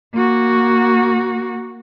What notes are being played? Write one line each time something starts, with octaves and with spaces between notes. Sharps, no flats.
A#3 F#4